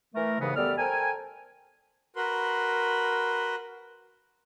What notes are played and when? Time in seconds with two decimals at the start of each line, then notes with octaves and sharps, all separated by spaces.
0.15 E3 A3 A#4
0.41 D#2 G#2 C#3 E3 G#3 B3
0.56 F#2 G3 B3 A4 D5 F6
0.78 A4 A#4 C5 G5 G#5
2.16 F#4 A#4 B4 B5 C6